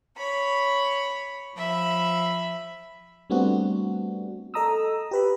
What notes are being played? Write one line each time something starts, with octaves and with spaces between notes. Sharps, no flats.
C#5 B5
F3 E5 B5
G3 A3 B3 C4 D4 F#4
A4 D#5 A#5 D#6 E6
G4 B4 B5